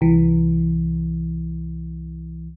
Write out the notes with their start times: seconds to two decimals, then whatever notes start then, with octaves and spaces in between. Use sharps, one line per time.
0.01 C2 E3